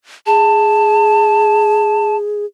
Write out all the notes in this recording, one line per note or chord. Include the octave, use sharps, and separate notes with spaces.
G#4 A5